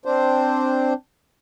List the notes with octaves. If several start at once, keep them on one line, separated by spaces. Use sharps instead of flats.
C4 D4 C5